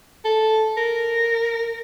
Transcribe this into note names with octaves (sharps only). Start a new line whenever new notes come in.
A4
A#4